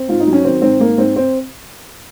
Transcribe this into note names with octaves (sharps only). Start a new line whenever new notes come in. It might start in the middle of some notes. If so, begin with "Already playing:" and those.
Already playing: C4
G#2 F4
D#4
F#3
C#4
D#3 C4
G#2 C4
G#2 A#3
G#2 C4
C4